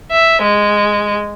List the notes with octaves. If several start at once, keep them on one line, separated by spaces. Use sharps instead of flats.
E5
G#3